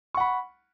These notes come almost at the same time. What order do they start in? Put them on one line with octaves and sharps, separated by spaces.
C#6 F#5 B5